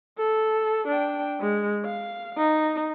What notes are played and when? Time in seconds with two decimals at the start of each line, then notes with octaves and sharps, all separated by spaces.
0.18 A4
0.88 D4 G5
1.40 G#3
1.86 F5
2.37 D#4